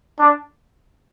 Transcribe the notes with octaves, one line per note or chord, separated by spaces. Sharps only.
D4